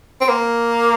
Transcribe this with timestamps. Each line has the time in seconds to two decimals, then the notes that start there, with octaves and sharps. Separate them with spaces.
0.21 C4
0.29 A#3